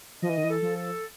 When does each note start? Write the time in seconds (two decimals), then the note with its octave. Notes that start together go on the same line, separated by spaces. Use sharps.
0.22 F3 D#5
0.29 E3
0.38 D#3
0.44 E3
0.49 A4
0.62 F3
0.76 A4